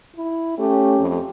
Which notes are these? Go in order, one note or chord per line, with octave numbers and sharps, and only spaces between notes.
E4
A3 C#4 G4
F2